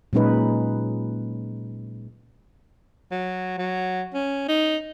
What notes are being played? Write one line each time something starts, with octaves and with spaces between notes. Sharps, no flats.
A#2 F#3 G#3 C#4 D#4 B4
F#3
F#3
C#4
D#4